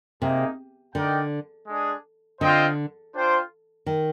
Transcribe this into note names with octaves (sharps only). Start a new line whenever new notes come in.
C3 A#3 D#4 G#4
D3 D#4 A#4 D5 G5
G#3 D4 G#4
D3 C4 F4 C5 D#5 G5
D4 F4 C5 G5
D#3